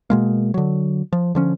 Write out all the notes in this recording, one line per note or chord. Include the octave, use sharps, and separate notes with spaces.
B2 G#3 A#3
D3 F#3
F3
D3 F3 C#4